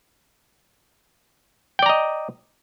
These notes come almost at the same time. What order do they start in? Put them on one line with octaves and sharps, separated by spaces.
G5 D5 A#5 D#5